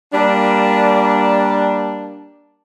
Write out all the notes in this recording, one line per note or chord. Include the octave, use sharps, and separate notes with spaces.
G3 A#3 D4